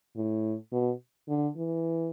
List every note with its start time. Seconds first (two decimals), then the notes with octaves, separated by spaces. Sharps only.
0.16 A2
0.72 B2
1.29 D3
1.56 E3